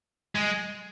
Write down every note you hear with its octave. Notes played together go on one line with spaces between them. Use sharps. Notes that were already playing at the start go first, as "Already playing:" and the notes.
G#3